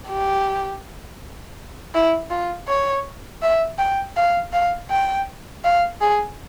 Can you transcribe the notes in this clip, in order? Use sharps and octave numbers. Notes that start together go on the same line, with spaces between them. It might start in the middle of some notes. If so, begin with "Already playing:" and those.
G4
E4
F4
C#5
E5
G5
F5
F5
G5
F5
G#4